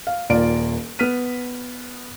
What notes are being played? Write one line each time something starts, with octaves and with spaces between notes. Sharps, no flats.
F5
D#1 A#3 F4 D5 D7
B3 F6 B6 D#7